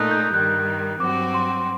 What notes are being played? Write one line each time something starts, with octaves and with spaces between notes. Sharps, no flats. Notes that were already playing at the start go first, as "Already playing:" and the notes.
Already playing: A#2 A3 D#4 D#6 F#6
G6
G2 D#3 G3 F#6
G2 F#3 C4 F#4 D6
C6